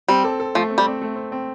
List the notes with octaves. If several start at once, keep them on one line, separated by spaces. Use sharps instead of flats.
G3 C4
A4
A4
F3 A3
C4
G3
C4
A3
C4
C4